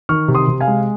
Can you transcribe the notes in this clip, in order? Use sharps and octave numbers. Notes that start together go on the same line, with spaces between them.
D#3 C#6 F6
C3
C6 D#6
C3
F5 G#5
G#3